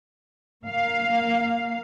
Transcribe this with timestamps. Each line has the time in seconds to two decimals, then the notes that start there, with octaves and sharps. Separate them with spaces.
0.64 A#3 F5